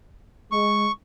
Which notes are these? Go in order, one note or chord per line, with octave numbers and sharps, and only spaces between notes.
G#3 C#6